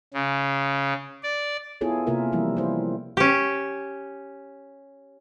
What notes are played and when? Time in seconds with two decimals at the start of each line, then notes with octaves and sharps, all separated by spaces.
0.14 C#3
1.23 D5
1.81 B3 E4 F4 G#4 A4 C#5
2.07 C3 A#3 F4 A#4 E5
2.32 E3 F3 G3 E4
2.57 E4 C5
3.17 C#4 G4